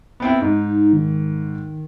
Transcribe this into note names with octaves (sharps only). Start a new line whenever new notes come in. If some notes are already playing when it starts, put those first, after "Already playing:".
B3 C4 E4
G#2 D#4
D#3